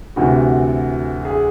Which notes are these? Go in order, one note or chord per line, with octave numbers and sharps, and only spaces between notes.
D2 C3 E3 F#4
G#4